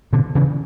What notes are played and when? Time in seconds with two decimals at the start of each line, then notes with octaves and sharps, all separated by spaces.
0.13 B2 D3
0.35 C#3 E3